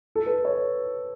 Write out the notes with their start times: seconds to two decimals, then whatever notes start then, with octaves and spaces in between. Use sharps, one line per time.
0.15 A4
0.26 B4
0.45 C#5